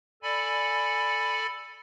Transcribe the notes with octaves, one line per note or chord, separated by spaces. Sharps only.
A4 D5 G#5 B5